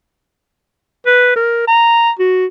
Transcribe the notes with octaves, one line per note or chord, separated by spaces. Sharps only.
B4
A#4
A#5
F#4